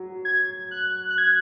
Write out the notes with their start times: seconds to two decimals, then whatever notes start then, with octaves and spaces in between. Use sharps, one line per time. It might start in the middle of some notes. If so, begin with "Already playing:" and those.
Already playing: F#3
0.25 G#6
0.71 F#6
1.10 F#6
1.18 G#6